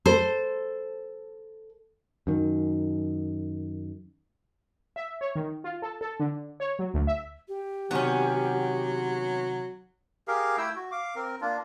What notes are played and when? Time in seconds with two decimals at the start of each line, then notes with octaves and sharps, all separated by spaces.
0.06 A4 C5
2.27 F#2 D#3
4.96 E5
5.21 C#5
5.35 D#3
5.64 F4
5.82 A4
6.01 A4
6.20 D3
6.60 C#5
6.79 F#3
6.94 D2
7.07 E5
7.48 G4
7.91 C3 D#3 F#3 B3 C#4
10.28 G4 G#4 A#4 F5
10.58 A3 E4 G5 E6
10.76 F#4
10.92 F5 D6
11.15 C4 A#4
11.41 A#3 D4 F4